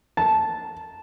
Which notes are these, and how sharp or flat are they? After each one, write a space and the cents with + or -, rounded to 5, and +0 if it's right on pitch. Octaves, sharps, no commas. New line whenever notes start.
A5 -10